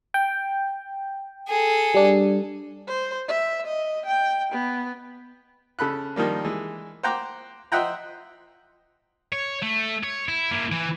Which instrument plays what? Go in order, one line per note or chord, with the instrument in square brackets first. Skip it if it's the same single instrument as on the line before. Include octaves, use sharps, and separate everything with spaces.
[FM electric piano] G5
[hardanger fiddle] G#4 A4
[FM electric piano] G3 D4
[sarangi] C5
E5
D#5
G5
B3
[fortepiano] C#3 A4 B5 F#6
D#3 F3 G3 A#3
E3 G#3
C5 F#5 G5 A#5 D6
C5 D#5 E5 F#5 G5 A#5
[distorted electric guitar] C#5
A3
C#5
E4
A#3 E4
E3